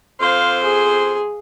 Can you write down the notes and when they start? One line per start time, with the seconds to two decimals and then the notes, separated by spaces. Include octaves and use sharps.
0.20 F2 C5 F5
0.63 G#4